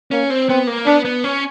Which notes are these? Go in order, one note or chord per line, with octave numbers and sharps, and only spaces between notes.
A#3 C#4
C4
B3 C4
A#3
B3 D4
B3
C#4